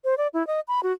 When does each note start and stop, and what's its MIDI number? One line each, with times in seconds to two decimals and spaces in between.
0.04 0.15 72
0.18 0.28 74
0.34 0.46 64
0.47 0.60 75
0.68 0.80 83
0.83 0.92 66